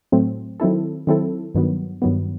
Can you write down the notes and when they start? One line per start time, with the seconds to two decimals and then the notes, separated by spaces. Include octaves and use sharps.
0.12 A2 F#3 A3 C4
0.60 D#3 F#3 C4 E4 A4
1.07 D#3 F#3 C4 E4 A4
1.55 G2 D#3 F#3 B3
2.02 G2 D#3 F#3 B3